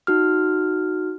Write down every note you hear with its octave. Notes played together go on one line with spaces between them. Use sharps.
D#4 F#4 F6